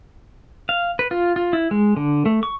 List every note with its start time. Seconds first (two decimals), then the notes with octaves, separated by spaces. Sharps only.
0.69 F5
0.99 B4
1.11 F4
1.36 F4
1.53 E4
1.71 G#3
1.97 D3
2.26 A3
2.43 C#6